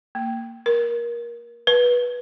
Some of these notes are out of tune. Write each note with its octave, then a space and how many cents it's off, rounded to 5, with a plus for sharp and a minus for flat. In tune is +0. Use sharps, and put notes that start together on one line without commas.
A#3 -10
A#4 +25
B4 -15